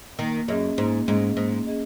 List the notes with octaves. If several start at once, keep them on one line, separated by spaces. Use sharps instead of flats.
D#3 A#3
F#2 C#4 G#4 D#5
G#2 A#3
G#2 C#4 G#4 D#5
G#2 A#3
C#4 G#4 D#5